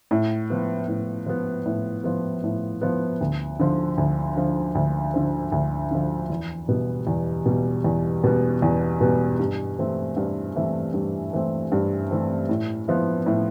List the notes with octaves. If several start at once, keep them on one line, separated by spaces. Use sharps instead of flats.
A2
F3 B3
A2
F3 B3
A2
F3 B3
A2
F3 B3
D2
D3 F3
D2
D3 F3
D2
D3 F3
D2
D3 F3
E2
B2 G3 B3
E2
B2 G3 B3
E2
B2 G3 B3
E2
B2 G3 B3
G2
E3 A3 C4
G2
E3 A3 C4
G2
E3 A3 C4
G2
E3 A3 C4
A2
F3 B3 E4
A2